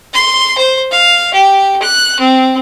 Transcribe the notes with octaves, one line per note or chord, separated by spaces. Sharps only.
C6
C5
F5
G4
F#6
C4